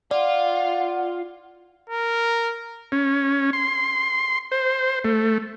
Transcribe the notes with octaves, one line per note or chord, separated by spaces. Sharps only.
F4 D5 F#5
A#4
C#4
C6
C5
A3